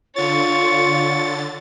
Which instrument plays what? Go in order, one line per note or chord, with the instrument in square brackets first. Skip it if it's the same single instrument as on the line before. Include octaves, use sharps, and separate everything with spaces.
[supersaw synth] D3 A6 [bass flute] F4 [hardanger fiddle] C#5